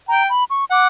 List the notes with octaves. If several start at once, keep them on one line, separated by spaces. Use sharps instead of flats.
G5 A#5
B5
C#6
F#5 D6